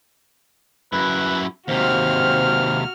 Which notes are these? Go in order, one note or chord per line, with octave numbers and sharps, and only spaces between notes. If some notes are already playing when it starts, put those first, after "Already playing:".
F#2 E4 B4
D#2 C3 F#4 C5 F5 F6